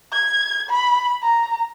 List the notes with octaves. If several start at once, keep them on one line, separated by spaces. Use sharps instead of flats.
G#6
B5
A#5